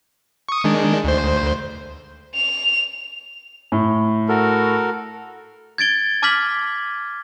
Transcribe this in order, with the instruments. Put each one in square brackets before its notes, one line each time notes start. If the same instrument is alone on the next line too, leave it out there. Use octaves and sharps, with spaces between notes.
[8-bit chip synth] C#6 D#6
D#3 G#3 D4
D2 C5
[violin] F7
[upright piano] A2
[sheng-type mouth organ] F#4 A4 A#4
[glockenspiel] G#6 A6 D7 G7
A5 D6 F6 G#6 B6 F#7